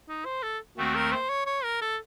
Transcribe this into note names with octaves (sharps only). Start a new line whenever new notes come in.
D#4
C5
A4
D#2 D#3 A3 C4 F#4
A#4
C5
C#5
C#5
A#4
A4